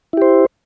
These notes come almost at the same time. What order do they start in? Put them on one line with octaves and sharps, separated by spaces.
E4 G4 C5